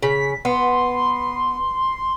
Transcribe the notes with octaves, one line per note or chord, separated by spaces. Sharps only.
C#3 B6
B3 C6